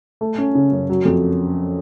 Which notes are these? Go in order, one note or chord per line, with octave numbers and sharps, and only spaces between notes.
A3
C#4
C#3
F#2
F#3
F2